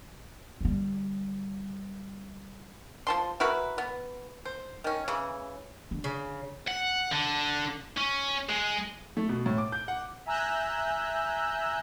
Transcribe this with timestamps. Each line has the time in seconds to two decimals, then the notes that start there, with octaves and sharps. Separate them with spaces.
0.61 D3 G3
3.07 F3 A5 C6
3.40 E4 F#4 A#4 B4
3.78 B3
4.45 C5
4.84 D#3 C#4
5.08 C#3 E3
5.91 D3
6.04 C#3
6.68 F#5
7.12 D3
7.97 C#4
8.49 G#3
9.17 A3
9.29 B2
9.46 A2
9.58 D6
9.72 G6
9.88 F#5
10.26 E5 G#5 A#5 E6 F#6 G6